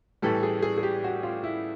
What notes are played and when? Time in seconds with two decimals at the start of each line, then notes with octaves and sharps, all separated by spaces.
0.22 A2 E3 G3 A4
0.43 G#4
0.62 G#4
0.78 G#4
0.83 G4
1.04 F#4
1.23 F4
1.44 E4